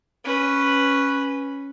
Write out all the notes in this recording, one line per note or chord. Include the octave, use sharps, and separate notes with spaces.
C#4 B4